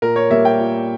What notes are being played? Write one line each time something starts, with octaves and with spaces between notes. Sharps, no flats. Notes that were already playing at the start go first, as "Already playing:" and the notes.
A#2 A#4
C#5
G3 A#3 E5
G5
A#2